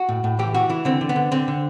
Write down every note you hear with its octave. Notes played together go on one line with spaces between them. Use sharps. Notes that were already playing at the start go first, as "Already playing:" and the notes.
Already playing: F#4
A2
A2
E3 G4
E3 F#4
E3 E4
D3 C4
D3
B3
D3
D3 C4
D3